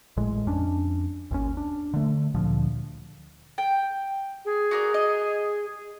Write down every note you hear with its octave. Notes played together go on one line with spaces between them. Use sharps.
A1 A2 G#3
F2 C#4 D4
G#1 D#2 C#4
D4
D3 A3
D2 A#2 D3 F3
G5
G#4
F#4 A#4 D5
D#5